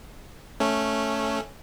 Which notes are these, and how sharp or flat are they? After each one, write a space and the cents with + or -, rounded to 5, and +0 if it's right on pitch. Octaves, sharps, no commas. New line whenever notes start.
A3 +0 C#4 +0